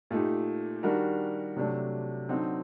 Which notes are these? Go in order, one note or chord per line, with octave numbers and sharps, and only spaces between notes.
A#2 A3 D#4 G4
D#3 G3 D4 F#4 A#4
C3 F#3 A3 D4
D3 F#3 C4 D#4